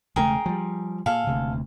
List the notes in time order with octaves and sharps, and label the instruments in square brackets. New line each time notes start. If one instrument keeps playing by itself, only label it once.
[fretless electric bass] E1 C#3 A3 [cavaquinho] G#4 A#4 G5
[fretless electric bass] F3 G3
[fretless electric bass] A#2 [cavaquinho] G#4 A4 F5
[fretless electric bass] D#1 D2 C3